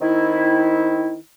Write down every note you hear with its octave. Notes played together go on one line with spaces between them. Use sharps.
D#3 C4 D#4 E4